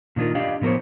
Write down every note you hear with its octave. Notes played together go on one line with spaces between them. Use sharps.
A#2 D#3 D4 F4 A#4
D4 G4 D5 D#5 F5
A2 F3 B3 A#4 C5 C#5